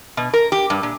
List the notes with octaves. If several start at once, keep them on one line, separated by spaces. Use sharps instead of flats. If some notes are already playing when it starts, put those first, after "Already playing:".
B2
A#4
G4
G2
A#2